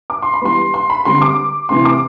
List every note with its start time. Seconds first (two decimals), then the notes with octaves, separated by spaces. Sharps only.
0.10 D6
0.22 C6
0.34 B5
0.42 E3 G3 B3 C6
0.74 C6
0.90 B5
1.05 D3 G3 C4 C6
1.22 D6
1.69 C3 E3 A3 C4 C6
1.85 D6